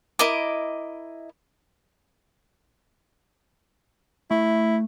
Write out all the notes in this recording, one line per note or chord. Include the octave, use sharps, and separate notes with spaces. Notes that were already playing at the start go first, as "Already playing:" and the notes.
E4 A#4 D#5 D6
A3 E4